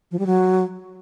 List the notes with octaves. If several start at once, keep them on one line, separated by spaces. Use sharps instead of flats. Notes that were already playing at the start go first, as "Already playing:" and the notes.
F3
G3
F#3